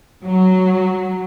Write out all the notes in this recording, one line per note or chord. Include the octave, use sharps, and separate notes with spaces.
F#3